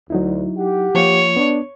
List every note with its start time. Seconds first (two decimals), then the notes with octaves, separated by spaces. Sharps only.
0.10 D2 F#3 D#4 E4
0.58 G4 F#5
0.95 F3 A#3 F4 C#5
1.36 B3 D4